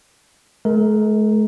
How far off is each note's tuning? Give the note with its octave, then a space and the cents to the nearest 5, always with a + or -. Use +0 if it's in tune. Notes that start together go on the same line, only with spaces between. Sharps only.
G#3 +45 A#4 +0